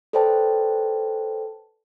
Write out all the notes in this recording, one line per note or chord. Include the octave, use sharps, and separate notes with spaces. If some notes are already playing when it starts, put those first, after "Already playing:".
A4 B4 C5 D5 G5 A5